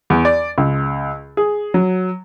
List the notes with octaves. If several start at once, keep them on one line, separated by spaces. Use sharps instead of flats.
E2
D5
C#2
G#4
F#3